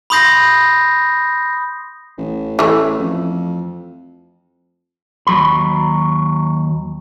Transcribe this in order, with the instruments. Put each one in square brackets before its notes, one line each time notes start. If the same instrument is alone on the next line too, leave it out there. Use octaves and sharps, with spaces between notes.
[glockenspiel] B5 C6 D#6 G6 A#6 C7
[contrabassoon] A1
[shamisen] E3 A3
[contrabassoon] F2
[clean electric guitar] D#2 F#3 B5